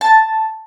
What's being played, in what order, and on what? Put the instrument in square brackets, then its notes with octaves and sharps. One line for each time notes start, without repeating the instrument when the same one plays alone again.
[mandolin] A5